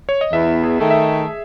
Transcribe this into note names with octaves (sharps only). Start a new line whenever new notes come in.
C#5
D#5
E2 E5
G#4
D#3 A3
E5